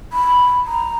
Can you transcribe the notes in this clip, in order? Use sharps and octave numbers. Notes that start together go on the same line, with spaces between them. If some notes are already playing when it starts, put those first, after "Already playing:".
B5
A#5